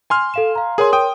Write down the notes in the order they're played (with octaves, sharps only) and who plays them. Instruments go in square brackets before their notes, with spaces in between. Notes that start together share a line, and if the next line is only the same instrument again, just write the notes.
[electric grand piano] G#5 C6 F6
[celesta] A4 F5 E7
F5 A#5
[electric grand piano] G#4 G#5 [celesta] A#4 C#5 C6
[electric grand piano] G5 D#6